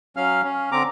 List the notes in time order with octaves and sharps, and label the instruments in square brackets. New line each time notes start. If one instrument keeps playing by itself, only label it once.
[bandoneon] F#3 C#4 F5 F6
C#4
D3 C4 A#5 D6